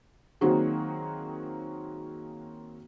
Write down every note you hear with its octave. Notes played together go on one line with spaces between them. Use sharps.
D#3 F#3 A#3 C4 F#4 G#4